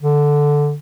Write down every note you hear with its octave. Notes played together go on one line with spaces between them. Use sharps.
D3